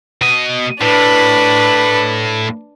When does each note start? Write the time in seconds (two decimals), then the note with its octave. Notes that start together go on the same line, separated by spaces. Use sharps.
0.22 B2 D#5
0.81 A2 D4 B4